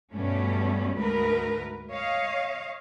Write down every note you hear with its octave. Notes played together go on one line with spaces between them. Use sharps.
G2 B2 G3 A3 C#4
D2 G#2 A#4 B4
C#5 D#5 F5